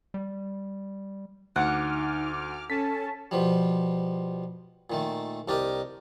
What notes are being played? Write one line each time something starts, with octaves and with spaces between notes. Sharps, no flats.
G3
D2 D#4 F#5 D6 F6
C#4 A4 A5 B6
B2 F3 G3
A#2 D#3 A3
C2 D4 G4 A#4 D#5